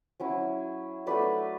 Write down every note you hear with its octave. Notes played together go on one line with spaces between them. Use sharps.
F#3 C#4 E4
F#3 A3 D4 B4 D5